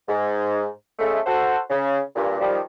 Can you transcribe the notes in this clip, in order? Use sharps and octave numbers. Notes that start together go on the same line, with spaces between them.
G#2
C#3 G#3 A3
F#4 A4 C5 F#5
C#3
G2 A#2
D#3 F3 G3